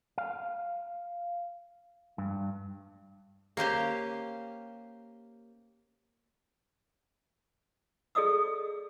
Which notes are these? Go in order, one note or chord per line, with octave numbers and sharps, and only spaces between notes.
F5
G2
A#3 C#4 G4 C5
G#4 A4 D5 D#5 D#6 E6